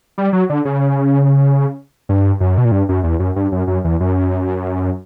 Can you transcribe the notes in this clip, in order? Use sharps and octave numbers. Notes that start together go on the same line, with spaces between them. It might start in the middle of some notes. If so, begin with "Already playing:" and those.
G3
F#3
D3
C#3
G2
F#2
B2
A#2
G2
F#2
E2
F#2
G2
F#2
F#2
E2
F#2